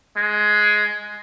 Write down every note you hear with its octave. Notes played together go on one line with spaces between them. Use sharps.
G#3